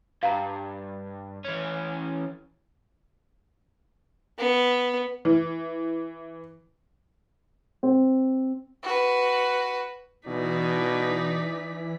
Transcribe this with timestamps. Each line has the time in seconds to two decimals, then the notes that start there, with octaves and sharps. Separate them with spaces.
0.23 G2 F5 A5 A#5
1.45 E3 C#4
4.39 B3
5.25 E3
7.83 C4
8.83 F#4 B4
10.27 B2 E3 D#4 D5 B6